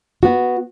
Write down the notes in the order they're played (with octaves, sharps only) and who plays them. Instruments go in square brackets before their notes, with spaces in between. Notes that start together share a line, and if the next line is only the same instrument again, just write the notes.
[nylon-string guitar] B3 F#4